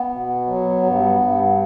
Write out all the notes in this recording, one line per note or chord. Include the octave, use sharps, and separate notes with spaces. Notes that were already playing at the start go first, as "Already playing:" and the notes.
Already playing: B3
B2
F#3
G2
G2